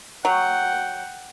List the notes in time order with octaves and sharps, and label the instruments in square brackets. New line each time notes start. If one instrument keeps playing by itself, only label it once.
[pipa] F#3 [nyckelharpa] F#5 G5